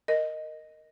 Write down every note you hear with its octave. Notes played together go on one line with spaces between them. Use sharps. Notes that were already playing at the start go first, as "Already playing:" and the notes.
A#4 D#5